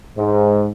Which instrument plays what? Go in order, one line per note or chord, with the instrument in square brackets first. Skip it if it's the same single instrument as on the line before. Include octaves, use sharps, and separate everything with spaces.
[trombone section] G#2